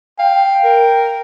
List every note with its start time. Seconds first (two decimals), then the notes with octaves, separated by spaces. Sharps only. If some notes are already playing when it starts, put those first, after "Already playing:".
0.19 F5 G5
0.64 A#4